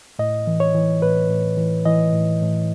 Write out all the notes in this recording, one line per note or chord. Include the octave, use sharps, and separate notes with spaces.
A2 D#5
E3
C#5
E3
A2 B4
A2
E3
E3 D#5
A2
A2